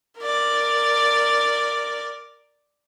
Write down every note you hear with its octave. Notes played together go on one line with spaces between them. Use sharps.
A#4 D5